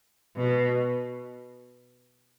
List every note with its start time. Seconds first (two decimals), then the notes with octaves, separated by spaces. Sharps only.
0.36 B2